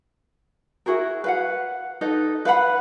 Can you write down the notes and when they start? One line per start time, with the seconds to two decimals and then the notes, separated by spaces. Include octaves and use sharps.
0.86 E4 F#4 G#4 A#4
1.24 B4 F5 F#5
2.01 D#4 A4 B4 D#5
2.45 B4 F5 F#5 B5